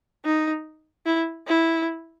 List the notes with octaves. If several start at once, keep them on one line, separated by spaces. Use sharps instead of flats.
D#4
E4
E4